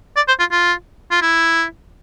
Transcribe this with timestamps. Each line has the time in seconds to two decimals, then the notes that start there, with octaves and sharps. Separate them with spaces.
0.16 D5
0.28 C5
0.40 F4
0.52 F4
1.11 F4
1.22 E4